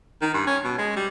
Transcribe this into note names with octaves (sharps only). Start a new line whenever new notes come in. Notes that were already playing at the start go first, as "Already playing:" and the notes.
D#3
G2
C#4
B2
G#3
G3